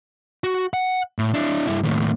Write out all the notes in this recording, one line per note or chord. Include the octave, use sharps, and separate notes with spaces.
F#4
F#5
A2
D4 E4
G2 E4
D#2 A2